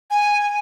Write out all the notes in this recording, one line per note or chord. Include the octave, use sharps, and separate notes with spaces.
G#5